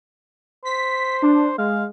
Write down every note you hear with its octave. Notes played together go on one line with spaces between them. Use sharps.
C5 B6
D4
G#3 F5